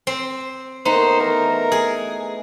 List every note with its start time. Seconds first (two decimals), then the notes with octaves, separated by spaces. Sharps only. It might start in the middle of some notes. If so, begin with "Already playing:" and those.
0.07 C4
0.85 D#3 A3 B3 D#4 C5
1.20 E3 A#4
1.72 G#4